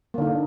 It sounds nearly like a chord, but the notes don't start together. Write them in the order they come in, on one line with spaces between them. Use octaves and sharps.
A#3 D3 D#4